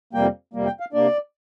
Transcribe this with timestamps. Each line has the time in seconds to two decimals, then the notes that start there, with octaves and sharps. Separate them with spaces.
0.13 F2 C3 G3 A#3 G5
0.54 F2 C3 G3 A#3
0.66 G5
0.80 F5
0.93 C3 A#3 D4 D5